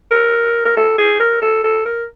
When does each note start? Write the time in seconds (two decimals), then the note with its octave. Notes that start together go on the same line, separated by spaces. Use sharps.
0.11 A#4
0.65 A#4
0.77 A4
0.98 G#4
1.20 A#4
1.42 A4
1.64 A4
1.85 A#4